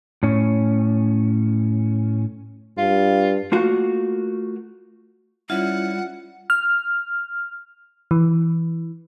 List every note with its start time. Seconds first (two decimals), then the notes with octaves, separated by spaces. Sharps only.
0.23 A2 C#4
2.78 G2 F4
3.52 A3 A#3 F4 F#4
5.50 G3 C#4 E4 F4 F#5
6.50 F6
8.11 E3